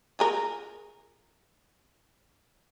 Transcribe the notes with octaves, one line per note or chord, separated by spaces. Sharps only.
F4 G#4 A#4